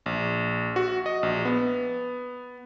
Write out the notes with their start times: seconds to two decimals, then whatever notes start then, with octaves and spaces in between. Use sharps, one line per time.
0.06 A#1
0.76 F#4
1.06 D#5
1.23 A#1
1.45 B3